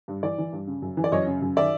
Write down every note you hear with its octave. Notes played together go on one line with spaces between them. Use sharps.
G2
E3 D5
E3
G2
C#3
F#2
E3
D5
F#2 C#5 D#5
C#3
F#2
D#3 D5 E5